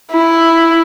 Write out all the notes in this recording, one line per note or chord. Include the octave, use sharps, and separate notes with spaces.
E4